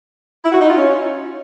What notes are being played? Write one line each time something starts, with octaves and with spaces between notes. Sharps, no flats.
E4
F#4
D#4
F4
C#4